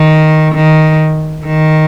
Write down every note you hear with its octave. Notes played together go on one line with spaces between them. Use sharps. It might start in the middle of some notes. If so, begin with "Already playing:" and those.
Already playing: D#3
D#3
D#3